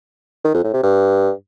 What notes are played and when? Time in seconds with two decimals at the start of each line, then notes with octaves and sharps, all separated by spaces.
0.45 D#3
0.54 F2
0.64 A2
0.73 C3
0.83 G2